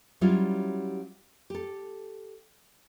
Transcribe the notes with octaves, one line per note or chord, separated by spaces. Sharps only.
F#3 G3 C#4 E4 F4
G4 A4